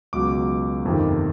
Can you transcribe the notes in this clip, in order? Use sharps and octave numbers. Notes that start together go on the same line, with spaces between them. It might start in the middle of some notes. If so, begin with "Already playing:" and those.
C#2 B2 F#3 D6
G1 F2 C3 D#3